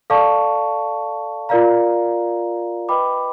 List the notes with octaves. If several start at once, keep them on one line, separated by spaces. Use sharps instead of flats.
A4 D5 F5 A5 C#6
F4 A#4 D5 F5 A#5
B4 D#5 G5 B5 D6